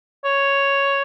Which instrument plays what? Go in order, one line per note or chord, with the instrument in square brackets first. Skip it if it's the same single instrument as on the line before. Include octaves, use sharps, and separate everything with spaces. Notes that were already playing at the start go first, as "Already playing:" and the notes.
[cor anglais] C#5